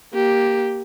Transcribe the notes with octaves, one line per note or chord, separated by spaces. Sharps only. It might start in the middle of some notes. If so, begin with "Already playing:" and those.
A#3 G4